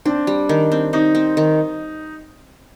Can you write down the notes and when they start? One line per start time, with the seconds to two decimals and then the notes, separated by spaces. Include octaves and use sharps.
0.05 C4 D4
0.27 G3
0.49 D#3
0.72 C4
0.93 C4 D#4
1.15 C4
1.37 D#3